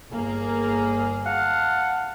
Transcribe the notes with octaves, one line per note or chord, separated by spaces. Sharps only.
G1 A#3 G#4
F5 F#5 A5